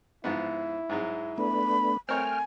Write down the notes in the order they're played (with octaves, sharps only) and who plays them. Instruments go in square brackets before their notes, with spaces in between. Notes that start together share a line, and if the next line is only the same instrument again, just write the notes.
[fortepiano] G#2 F3 B3 [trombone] E4
[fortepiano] G#2 F#3 G#3
[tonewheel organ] A3 B3 D4 [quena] B5
[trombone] A3 [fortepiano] C4 A#4 C#5 [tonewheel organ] G5 F6 [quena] G#5